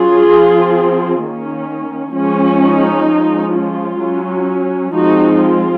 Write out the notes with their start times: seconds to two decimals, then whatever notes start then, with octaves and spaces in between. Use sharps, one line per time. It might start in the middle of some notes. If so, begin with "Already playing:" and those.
Already playing: F#3 C#4 F4 G#4
0.30 F3 C4
1.23 D#3 A#3 C#4
2.16 F3 G#3 C#4
2.62 D#4
3.08 F3 G#3 C#4
3.55 F4
4.01 F#3 C#4
4.94 F3 G#3 C4 D#4 F#4
5.41 F4